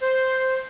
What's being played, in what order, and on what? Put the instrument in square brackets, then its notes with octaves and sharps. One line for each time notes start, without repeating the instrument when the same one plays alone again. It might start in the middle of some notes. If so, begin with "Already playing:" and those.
[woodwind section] C5